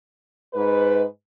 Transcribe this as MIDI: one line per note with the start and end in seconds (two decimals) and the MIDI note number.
0.54 1.02 44
0.54 1.02 71
0.54 1.02 75